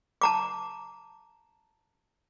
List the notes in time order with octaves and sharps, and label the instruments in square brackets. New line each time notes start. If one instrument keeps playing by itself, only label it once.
[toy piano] A5 A#5 D6